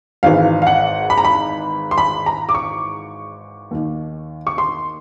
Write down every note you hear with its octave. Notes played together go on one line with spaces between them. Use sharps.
G#1 G#2 E3 F5
F5
F#5
B5
A#5
B5
C6
B5
A#5
D6
C#6
D#2 D#3
C#6
C6